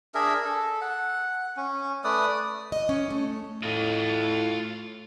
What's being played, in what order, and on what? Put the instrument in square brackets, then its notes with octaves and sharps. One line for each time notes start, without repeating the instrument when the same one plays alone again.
[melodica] D4 G#4 A#4 E5
A4
F#5
C#4
A3 B4 D5 D#6
[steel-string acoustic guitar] D#5
C#4
A3
[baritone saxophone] A2 [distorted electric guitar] F4 D#5